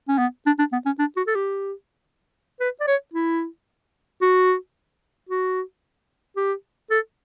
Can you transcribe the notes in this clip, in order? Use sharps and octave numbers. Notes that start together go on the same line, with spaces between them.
C#4
B3
D4
D4
B3
C#4
D4
F#4
A4
G4
B4
D5
C#5
E4
F#4
F#4
G4
A4